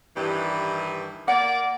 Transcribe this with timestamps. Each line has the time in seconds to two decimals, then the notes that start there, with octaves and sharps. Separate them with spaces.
0.17 G2 D#3 E3 G4
1.28 A#3 D5 F#5